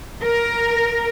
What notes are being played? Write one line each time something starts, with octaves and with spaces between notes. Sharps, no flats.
A#4